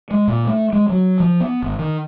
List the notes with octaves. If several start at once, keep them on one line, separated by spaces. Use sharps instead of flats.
G#3
A#2
A3
G#3
F#3
F3
B3
G#1
D#3